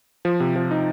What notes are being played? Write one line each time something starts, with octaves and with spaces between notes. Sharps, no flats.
F3
C3
F3
D#4